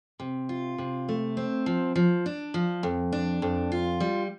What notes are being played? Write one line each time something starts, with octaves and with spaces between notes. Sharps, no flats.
C3
F4
C3
A3
C4
F3
F3
D4
F3
F2
D4
F2
F4
G3